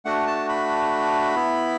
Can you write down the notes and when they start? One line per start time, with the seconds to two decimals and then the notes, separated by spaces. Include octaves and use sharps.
0.05 A3 D4 F#4 F#5
0.27 A5
0.49 B5
1.36 B3 E4